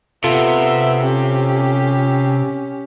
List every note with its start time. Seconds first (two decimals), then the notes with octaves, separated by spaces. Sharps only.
0.24 C3 B3 F4 A4 E5
1.03 C#4 G4